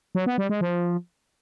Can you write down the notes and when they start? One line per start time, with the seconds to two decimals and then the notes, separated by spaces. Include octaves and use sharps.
0.15 F#3
0.26 B3
0.38 G3
0.49 G#3
0.61 F3